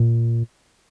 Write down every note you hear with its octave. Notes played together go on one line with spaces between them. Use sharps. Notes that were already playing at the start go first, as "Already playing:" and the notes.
Already playing: A#2